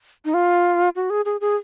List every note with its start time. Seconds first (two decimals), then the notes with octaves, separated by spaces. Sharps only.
0.25 D#4
0.34 F4
0.96 F#4
1.10 G#4
1.25 G#4
1.41 G#4